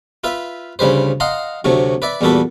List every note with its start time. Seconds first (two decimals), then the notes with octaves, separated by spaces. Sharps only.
0.24 F4 B4 E5
0.79 D2 C#3 G3 B4 C5
1.20 D#5 F5 F#5 A#5 C6
1.64 D2 C3 F#3 A3
2.02 B4 D5 E5
2.21 E2 A#2 G3 F#4 A4 B4